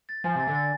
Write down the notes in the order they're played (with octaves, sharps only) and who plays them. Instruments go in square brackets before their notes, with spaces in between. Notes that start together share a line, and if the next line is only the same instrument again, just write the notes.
[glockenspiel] A6
[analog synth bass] F3 [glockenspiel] G#5
[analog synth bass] C3 [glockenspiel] A6
[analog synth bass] D3
[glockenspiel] A6